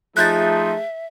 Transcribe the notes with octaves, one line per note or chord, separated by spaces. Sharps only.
F3 A3 D#4 G#4 E5 F#6 G6 A6